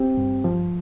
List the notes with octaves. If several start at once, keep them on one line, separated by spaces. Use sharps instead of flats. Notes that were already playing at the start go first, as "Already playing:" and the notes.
Already playing: C4 G4
G2
F3